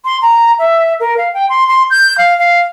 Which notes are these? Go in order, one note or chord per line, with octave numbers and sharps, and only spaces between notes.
C6
A#5
E5
A#4
F5
G5
C6
C6
G6
F5
F5